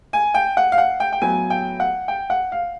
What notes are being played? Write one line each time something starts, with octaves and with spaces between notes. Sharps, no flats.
G#5
G5
F#5
F5
F#5
G5
G5
A2 F#3 B3 G#5
G5
F#5
G5
F#5
F5